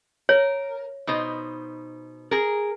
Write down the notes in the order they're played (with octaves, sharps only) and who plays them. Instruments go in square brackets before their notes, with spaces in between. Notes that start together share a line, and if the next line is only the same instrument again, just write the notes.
[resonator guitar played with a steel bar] A#4 [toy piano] C#5
[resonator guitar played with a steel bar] B2 D#4 C5
G#4 A#4